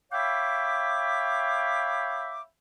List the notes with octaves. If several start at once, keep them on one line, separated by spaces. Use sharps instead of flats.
C#5 E5 F5 G5 B5 D6